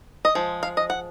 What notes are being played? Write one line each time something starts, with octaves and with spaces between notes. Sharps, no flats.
D#5
F3 G#3
F5
D#5
F#5